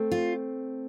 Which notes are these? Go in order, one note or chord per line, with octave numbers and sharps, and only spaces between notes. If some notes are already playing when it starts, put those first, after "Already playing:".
Already playing: A3 C4
F4